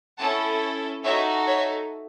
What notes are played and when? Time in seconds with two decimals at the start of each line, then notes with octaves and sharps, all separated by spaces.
0.18 C#4 E4 A4 F#5 A5
1.04 D#4 F#4 A4 C#5 E5
1.46 C#5 E5